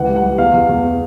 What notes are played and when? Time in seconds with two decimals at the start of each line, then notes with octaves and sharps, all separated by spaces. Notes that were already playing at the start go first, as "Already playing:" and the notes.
Already playing: C#2 E3 F#5
0.08 G3
0.16 F#5
0.24 G3
0.38 E2 F5
0.54 E2
0.69 E2